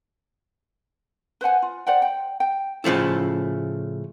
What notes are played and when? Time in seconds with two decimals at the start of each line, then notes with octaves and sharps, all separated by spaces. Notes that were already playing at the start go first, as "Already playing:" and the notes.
1.41 B4 C5 F#5 G#5
1.62 F4
1.87 C5 D5 F#5 G5
2.02 G5
2.40 G5
2.84 A2 C#3 F3 A3 E4